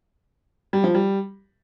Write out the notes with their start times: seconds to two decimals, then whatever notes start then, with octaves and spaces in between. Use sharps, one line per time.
0.73 G3
0.84 F3
0.94 G3